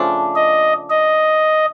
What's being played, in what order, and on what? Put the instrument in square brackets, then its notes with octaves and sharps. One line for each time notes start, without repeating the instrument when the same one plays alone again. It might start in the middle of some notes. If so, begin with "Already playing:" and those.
Already playing: [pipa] C#3 F3 A3 D4
[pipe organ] D#5
D#5